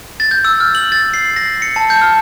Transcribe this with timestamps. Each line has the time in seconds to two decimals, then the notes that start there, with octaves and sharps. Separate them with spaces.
0.20 A6
0.31 G6
0.45 E6
0.60 F6
0.75 F#7
0.92 A6
1.14 C7
1.36 A#6
1.62 C#7
1.76 A5
1.90 G6
2.01 F6